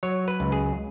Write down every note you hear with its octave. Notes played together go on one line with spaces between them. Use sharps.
F#3 C#5
B4
C#2
G#4